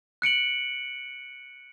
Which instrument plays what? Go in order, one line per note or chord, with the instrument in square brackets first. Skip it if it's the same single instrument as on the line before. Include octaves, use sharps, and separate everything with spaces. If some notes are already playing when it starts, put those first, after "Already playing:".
[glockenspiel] F#6 C#7 D7 F#7